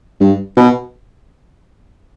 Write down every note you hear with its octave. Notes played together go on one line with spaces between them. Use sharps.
G2
B2